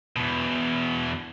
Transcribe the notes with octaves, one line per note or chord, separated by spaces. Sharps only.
E2 B2